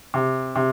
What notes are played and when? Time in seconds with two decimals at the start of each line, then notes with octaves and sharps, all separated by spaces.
0.14 C3
0.56 C3